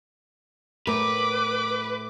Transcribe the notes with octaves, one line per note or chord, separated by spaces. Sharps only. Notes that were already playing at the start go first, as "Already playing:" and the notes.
A2 A#4 B4 D6